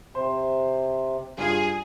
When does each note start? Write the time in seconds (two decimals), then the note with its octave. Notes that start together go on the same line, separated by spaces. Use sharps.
0.15 C3 C5
1.38 G2 F4 G#4